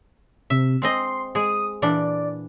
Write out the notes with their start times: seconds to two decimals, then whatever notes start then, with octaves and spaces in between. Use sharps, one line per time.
0.50 C3 E5
0.82 G#3 C4 D#5 C6
1.35 G#3 G#4 D#6
1.82 A#2 E3 D4 D5